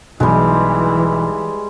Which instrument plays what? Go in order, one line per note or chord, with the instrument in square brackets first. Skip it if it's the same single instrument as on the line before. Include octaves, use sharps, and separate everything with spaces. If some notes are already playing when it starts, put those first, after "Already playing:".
[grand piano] B1 [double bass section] E3 [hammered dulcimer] G3 G#3